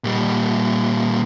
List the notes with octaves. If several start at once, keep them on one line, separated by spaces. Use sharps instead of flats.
A#2 G3